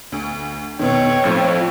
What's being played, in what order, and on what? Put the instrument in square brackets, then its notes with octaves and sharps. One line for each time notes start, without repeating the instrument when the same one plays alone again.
[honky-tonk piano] D2
[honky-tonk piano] F2 B2 D#3 [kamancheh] C#5 G5
[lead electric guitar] F2 [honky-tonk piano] A2